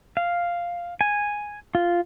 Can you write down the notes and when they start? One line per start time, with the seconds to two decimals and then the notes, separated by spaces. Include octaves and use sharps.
0.17 F5
1.01 G#5
1.75 F4